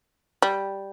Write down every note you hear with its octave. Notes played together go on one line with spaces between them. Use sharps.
G3